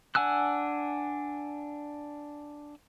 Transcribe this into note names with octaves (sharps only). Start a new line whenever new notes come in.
D4 F#5 G#5 E6 F#6